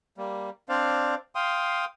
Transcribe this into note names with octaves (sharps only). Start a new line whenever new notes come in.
G3 A#3
C4 D4 C5 D5 F5
F5 G5 C6 D#6